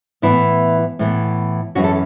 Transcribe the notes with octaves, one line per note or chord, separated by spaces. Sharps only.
A2 E3 B3 E4
A2 E3 B3
F#2 E3 C#4 F#4
A4